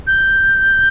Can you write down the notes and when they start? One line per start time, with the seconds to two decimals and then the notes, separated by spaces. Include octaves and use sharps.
0.07 G6